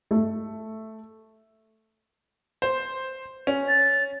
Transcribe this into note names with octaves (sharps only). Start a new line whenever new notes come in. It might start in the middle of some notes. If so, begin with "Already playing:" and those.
A3
C5
C#4
A6